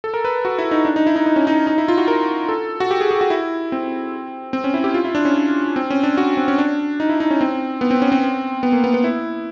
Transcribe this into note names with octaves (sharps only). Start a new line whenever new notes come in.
A4
A#4
B4
F#4
E4
D#4
D4
D#4
E4
D#4
D#4
C#4
D#4
D#4
E4
F4
F#4
A#4
A4
F#4
G4
G#4
G#4
F#4
E4
C4
C4
C#4
E4
G4
F4
E4
D4
C#4
C4
C#4
D4
F#4
C4
C#4
D4
D#4
E4
D#4
C#4
C4
B3
C4
C#4
C4
B3
A#3
B3
B3
E4